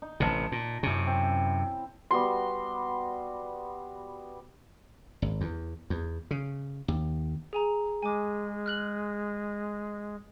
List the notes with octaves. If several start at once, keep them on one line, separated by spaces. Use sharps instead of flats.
D#4
A1 C3 A5 A#5
A#2
F#2 C3 C#4 E4
C4
G3 B3 F#4 C6
G#1
E2
E2
C#3
D#2
G#4 G#5 A#5
G#3 G#5 D6
F6 F#6 F#7